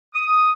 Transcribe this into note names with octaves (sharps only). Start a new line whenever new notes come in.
D#6